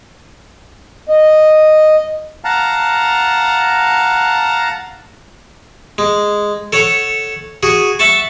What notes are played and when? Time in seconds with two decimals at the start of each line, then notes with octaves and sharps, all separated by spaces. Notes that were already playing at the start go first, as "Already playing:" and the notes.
1.09 D#5
2.45 F5 F#5 A5 A#5
5.98 G#3
6.73 A4 C#5 F#5
7.63 F#4 G#4
7.99 E5 F#5 A5 C#6